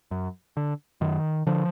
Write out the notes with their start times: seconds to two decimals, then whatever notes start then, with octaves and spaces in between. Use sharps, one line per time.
0.11 F#2
0.57 D3
1.01 F#2 D#3
1.47 D3 F3